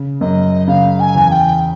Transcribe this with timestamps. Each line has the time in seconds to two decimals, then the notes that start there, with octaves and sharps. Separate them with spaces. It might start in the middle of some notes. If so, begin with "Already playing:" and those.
Already playing: C#3
0.21 F#2 D#5
0.68 C#3 F5
1.00 G#5
1.15 E2
1.31 G5